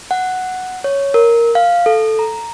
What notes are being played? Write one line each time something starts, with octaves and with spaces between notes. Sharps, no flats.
F#5
C#5
A#4
F5
A4
A#5